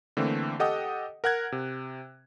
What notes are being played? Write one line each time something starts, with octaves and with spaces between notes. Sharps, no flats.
D3 E3 A3 A#3 C4
G4 A4 D#5 F#5 G5 D#6
A#4 F#5 F#6 G#6
C3